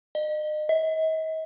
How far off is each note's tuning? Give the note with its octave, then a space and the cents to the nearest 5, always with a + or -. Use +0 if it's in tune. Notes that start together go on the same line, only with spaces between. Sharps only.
D#5 -35
D#5 +40